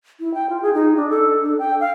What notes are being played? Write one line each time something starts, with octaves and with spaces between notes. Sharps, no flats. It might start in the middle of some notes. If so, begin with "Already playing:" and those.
E4
G5
F4
G#4
D#4
D4
A4
D4
G5
F5